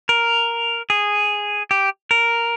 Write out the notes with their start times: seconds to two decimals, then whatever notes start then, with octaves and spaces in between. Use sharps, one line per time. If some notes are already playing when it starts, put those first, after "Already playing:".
0.09 A#4
0.90 G#4
1.71 G4
2.11 A#4